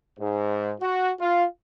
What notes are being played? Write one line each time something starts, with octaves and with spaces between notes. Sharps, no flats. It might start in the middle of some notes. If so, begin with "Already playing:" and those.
G#2
F#4
F4